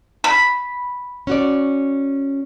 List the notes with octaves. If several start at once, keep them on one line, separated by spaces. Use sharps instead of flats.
B5
C#4 F#4 D5